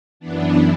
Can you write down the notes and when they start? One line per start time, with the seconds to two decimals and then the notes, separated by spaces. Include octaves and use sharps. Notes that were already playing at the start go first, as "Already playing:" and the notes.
0.20 F#2 E3 B3 D4